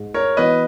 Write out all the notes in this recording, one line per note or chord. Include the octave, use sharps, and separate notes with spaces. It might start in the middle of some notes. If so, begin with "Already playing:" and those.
Already playing: G#2
A#4 C#5
E3 B3 F#4 B4 D#5